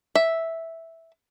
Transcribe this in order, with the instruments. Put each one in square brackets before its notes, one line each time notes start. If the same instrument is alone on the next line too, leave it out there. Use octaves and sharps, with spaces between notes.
[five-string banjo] E5